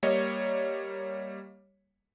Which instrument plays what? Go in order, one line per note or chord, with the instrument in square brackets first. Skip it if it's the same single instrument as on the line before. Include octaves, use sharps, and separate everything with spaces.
[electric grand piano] G3 A#3 C#5 D#5